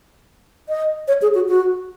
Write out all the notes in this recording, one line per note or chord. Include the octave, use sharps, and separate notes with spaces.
D#5
C#5
G#4
F#4
F#4